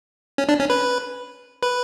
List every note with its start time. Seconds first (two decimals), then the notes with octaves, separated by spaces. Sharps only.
0.38 C#4
0.49 D4
0.60 C#4
0.70 B4
1.63 B4